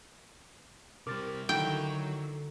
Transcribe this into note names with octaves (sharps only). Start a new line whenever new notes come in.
C3 G3 A#4 D6 A6
D3 D#3 F#3 E4 G5